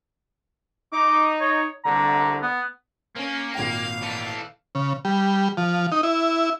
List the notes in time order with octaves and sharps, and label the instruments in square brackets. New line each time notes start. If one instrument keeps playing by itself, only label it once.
[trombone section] D#4 [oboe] D6
[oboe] C#5
[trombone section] C2 D3 [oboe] A#5
[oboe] B3
[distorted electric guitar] A#3 [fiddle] C#4
[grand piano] G#1 A#2 G5 [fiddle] F5
[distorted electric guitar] E3 A4
[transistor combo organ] C#3
G3
F3
D#4
E4